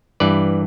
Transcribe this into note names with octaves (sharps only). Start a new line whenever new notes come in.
G2 E3 B4 D5